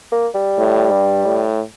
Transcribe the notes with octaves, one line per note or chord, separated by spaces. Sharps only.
A#3
G3
A2
G2
A2